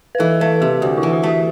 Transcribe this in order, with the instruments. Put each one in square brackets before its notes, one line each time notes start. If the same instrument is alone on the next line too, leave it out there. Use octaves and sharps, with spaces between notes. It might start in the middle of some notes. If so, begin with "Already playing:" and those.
[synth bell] B4
[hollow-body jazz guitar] E3 [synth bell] A4
[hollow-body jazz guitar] A3 [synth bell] B4
[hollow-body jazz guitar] C3 [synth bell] G4
[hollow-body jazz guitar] D2 [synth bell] F#4
[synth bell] E4
[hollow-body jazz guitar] E3
[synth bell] F#4
[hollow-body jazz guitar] A3 [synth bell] F#4